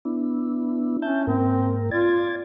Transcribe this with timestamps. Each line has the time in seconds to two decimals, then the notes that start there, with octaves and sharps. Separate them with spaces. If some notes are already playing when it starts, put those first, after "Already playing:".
0.05 B3 D4 E4
1.02 C#4 E5 A5 G6
1.27 G#2 A#3 C4 A#4
1.91 F4 D5 G#6 A6